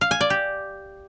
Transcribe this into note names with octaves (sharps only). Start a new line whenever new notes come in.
F5
G#5
D5
G4